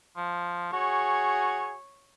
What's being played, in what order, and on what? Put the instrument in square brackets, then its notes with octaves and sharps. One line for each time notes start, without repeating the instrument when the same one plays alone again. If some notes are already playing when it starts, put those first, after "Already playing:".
[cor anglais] F3
[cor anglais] F#4 [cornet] G#4 [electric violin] C#5